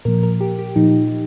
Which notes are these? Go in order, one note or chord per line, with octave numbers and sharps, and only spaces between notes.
A#2 F3 A#4
A#4
G4
G4
A#2 F3 D#4